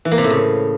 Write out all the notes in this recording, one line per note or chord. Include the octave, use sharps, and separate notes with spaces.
E3
A#3
C3
A2
C#3